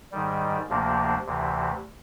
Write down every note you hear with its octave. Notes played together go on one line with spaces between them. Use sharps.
G#2 D#3 G3
D2 C3 F3 A#3 D4
D2 C3 E3